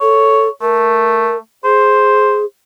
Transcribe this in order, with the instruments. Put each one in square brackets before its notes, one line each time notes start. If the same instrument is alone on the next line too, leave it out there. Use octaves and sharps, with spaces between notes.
[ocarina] A4 [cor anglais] C#5
[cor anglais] A3 [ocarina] A#4
[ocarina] G#4 [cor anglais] C5